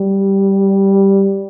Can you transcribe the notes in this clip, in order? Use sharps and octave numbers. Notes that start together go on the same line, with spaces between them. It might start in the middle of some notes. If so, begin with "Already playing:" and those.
Already playing: G3